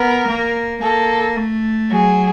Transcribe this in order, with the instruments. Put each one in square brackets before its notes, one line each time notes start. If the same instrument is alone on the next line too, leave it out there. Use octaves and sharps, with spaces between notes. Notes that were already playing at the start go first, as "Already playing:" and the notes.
Already playing: [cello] B3 [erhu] A#4
[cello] A#3
[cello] A#3 [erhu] A4
[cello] A3
[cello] F#3 [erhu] G#4